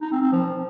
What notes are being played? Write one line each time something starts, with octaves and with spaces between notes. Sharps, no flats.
D#4
C4
C4
F3